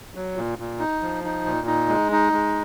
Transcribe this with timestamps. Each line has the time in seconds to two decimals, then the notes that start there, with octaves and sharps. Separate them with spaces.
0.15 F#3
0.36 A#2
0.59 A#2
0.80 D#4
1.02 F3
1.24 D#4
1.46 A#2
1.67 D#4
1.89 G#3
2.12 D#4
2.33 G#3